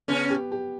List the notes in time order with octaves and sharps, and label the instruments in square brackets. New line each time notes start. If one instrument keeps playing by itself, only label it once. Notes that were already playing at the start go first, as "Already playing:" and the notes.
[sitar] C#3 C#4 [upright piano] B3
[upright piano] G4
G4